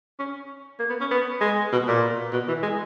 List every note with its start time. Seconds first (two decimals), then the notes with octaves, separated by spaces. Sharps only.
0.19 C#4
0.79 A#3
0.90 B3
1.00 C#4
1.11 B3
1.41 G#3
1.72 B2
1.87 A#2
2.33 B2
2.48 E3
2.63 G#3